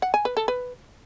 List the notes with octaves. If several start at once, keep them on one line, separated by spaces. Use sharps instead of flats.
F#5
G#5
B4
A4
B4